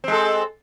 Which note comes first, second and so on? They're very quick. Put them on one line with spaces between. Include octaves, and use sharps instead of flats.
C4 G#3 A4